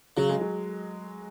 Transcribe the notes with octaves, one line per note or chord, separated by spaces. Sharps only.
C#3 F#3
G#3
F#3